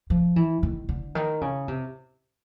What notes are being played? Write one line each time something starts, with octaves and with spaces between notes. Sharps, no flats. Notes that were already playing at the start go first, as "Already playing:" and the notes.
F3
E3
D#3
D3
D#3
C#3
C3